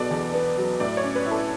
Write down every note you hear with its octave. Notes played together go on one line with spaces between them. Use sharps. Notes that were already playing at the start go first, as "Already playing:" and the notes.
Already playing: B2 F#3 B3 G#4 A4 D5
E2
B3
F#3
A2 D5
C#5
C#4
B4
E4
A4